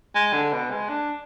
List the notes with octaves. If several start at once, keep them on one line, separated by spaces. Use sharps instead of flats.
G#3
D3
B2
G#3
D4